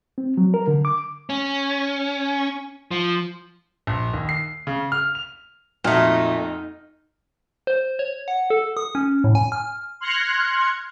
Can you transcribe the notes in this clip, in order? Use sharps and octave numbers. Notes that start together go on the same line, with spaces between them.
C4
F#3
A#4
D3
D6
C#4
F3
A#1
D#2
C7
C#3
F6
F7
F2 A#2 A3 D#4 F#4 F6
C5
C#5
F#5
A4
D#6
C#4
A2
G#5
F6
C6 F6 F#6 G#6 A#6 C#7